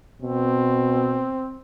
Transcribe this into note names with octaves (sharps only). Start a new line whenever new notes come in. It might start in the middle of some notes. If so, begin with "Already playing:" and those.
B2 C4